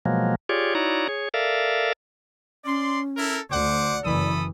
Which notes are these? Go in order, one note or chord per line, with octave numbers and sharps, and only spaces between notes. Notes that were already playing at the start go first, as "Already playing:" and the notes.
B2 F3 F#3 G#3 A#3
F4 G4 G#4 C#5 D5
D#4 E4 F#4 C#5 D5 A#5
G#4 C#5
A4 A#4 D5 E5 F5
C#4 D5 C6
E4 A4 A#4
D2 C5 D5 F#5 D6
F#1 E3 A4 B5 D#6